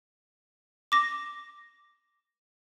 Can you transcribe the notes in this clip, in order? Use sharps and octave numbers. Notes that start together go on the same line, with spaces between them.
D6 A#6